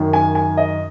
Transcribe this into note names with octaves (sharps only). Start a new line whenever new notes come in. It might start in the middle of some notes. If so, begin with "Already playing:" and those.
Already playing: F#2 D#3
G#5
G#5
D#5